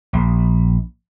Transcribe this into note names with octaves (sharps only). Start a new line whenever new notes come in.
A#1